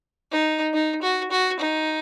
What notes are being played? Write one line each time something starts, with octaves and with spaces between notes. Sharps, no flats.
D#4
D#4
F#4
F#4
D#4